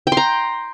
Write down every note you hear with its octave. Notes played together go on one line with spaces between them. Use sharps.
G5
C6
A#5